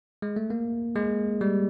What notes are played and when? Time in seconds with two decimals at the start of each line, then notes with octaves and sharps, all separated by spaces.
0.22 G#3
0.36 A3
0.50 A#3
0.96 G#3
1.41 G3